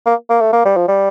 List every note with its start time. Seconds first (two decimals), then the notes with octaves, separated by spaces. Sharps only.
0.06 A#3
0.30 A#3
0.41 A3
0.53 A#3
0.65 G3
0.77 F3
0.88 G3